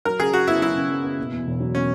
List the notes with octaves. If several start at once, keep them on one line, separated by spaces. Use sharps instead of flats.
F#3 A#4
C#3 G#4
F#2 F#4
B3 E4
F#3 E4
C#3
F#2
B3
B2
E2
E1
F#3
B2 C#4